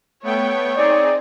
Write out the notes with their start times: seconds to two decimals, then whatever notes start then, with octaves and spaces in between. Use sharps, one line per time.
0.23 A3 B3 C#5 G5
0.77 C4 D#4 G#4 D5